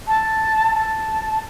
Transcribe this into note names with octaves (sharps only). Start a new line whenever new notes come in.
A5
A5